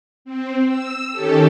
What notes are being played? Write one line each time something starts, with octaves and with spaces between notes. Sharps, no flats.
C4
E6
D#3 C#4 G4 A4